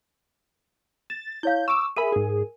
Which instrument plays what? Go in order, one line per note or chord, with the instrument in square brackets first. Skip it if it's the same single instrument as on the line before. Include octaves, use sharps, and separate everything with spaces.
[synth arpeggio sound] A6 [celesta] E7
[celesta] E4 C#5 F5 [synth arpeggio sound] G6
[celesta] C#6 E7 [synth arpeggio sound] D6 E6
[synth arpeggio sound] G#4 E5 B5 [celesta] A#4 G#5 D#7
[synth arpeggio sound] G#2 G#4